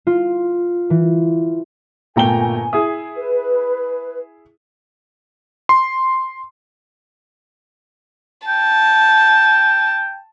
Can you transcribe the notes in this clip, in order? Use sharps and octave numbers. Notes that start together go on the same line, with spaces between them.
F4
E3
G1 A#2 A3 G5 G#5 A#5 G7
E4 G#4 D#6
B4
C6
G5 A5